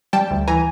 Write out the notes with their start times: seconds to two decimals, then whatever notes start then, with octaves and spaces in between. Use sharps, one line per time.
0.13 G3 G5 A5
0.31 D2
0.47 E3 G#5 A#5